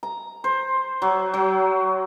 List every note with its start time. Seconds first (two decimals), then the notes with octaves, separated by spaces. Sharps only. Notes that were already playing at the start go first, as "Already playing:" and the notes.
0.03 A#5
0.44 C5
1.02 F#3
1.34 F#3